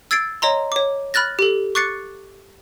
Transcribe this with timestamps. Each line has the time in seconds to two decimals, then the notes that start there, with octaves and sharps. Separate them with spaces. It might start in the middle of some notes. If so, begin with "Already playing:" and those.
0.11 E6 G#6 A6 C7 D7
0.42 C#5 D#5 A#5 C6
0.72 C#5 D6
1.14 B5 F6 F#6 A6 A#6
1.39 G4 A4
1.75 C#6 D6 F#6 A6 C7 C#7